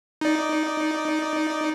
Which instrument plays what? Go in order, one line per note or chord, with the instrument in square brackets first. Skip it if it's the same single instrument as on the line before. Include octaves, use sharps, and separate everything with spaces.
[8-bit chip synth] D#4 D5